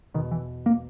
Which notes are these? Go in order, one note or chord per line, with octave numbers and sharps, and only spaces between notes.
E2 B2 D#3
E3
A#3